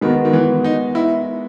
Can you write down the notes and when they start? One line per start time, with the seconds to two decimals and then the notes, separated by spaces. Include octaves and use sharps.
0.01 D#3 G#3 B3 F#4 A#4
0.25 D#3
0.33 E3
0.64 D#4
0.95 E4